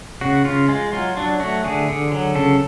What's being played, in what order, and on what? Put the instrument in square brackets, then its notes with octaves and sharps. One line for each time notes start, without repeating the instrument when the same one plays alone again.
[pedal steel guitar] C#3 F#4
C#3 F4
G#3 F4
F#3 F4
F#3 D4
A3 F#4
D3 G#4
D3
F#3
C#3 A4